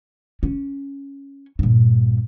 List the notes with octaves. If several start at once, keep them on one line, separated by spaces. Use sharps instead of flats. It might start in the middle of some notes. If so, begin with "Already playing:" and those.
C#4
G2 A#2